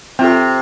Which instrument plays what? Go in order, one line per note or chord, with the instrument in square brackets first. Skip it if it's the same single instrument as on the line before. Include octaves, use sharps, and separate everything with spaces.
[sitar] C3 [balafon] C4 F4 A4